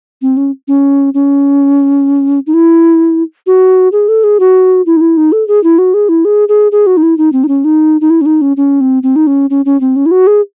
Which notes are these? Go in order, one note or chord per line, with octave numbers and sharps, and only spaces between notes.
C4
C#4
C#4
C#4
D#4
E4
F#4
G#4
A4
G#4
F#4
E4
D#4
E4
D#4
A4
G#4
E4
F#4
G#4
E4
G#4
G#4
G#4
F#4
D#4
E4
D#4
C4
D#4
C#4
D#4
D#4
E4
C#4
D#4
C#4
C#4
C4
C4
D#4
C#4
C#4
C#4
C4
C#4
E4
F#4
G#4